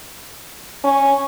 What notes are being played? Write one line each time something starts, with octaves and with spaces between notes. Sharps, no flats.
C#4